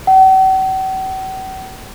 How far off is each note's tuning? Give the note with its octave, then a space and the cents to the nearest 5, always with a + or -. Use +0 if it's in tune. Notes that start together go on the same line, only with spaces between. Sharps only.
F#5 +45